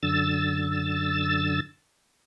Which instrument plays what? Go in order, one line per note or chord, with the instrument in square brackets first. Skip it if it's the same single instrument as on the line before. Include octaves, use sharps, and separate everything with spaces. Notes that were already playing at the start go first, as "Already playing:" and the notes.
[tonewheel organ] F#2 D3 E6 A6